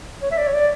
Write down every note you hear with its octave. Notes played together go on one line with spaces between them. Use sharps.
C#5
E5
D5
C#5
D5